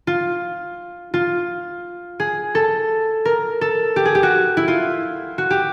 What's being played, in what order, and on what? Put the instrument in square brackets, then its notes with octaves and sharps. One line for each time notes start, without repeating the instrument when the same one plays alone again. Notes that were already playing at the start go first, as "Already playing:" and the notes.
[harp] F4
F4
G#4
A4
A#4
A4
G4
G#4
G4
F#4
E4
F4
F#4
G4